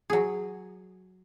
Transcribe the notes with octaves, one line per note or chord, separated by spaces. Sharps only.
F#3 G#4